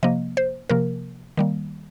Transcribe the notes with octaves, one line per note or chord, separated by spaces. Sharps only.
C3 F3 A#3 D#5
C5
C3 F3 A#3 A#4
D#3 G3 A#3